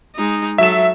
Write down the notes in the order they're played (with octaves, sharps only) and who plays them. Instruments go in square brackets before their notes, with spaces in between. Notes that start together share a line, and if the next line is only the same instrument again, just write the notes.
[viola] G#3 D#4
[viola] F#3 A4 [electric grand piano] E5 E7